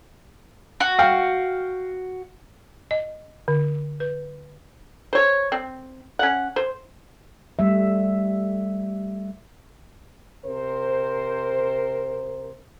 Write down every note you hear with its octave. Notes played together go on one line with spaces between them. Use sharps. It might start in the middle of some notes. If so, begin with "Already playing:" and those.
F#4
F5 G5
D#5
D3
B4
C5 C#5
C4
C#4 F#5
C5
G3 A3 E5
C3 A#4 C5